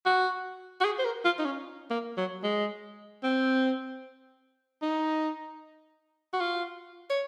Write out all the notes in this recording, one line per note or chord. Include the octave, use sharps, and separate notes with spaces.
F#4
F#4
G#4
C5
A#4
F4
D#4
C#4
A#3
F#3
G#3
C4
D#4
F#4
F4
C#5